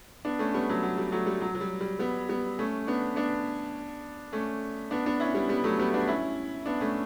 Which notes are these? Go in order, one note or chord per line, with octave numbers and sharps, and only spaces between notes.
B3 D4
A3 C#4
G3 B3
F#3 A3
F#3
G3
F#3 A3
G3
F#3
F#3
G3
G3
G3 B3
G3 B3
A3 C#4
B3 D4
B3 D4
A3 C#4
B3 D4
B3 D4
C#4 E4
G3 B3
G3 B3
F#3 A3
G3 B3
B3 D4
C#4 E4
B3 D4
A3 C#4